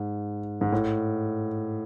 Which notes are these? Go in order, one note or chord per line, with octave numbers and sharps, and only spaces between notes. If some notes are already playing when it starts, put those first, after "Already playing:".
Already playing: G#2
G#2
A2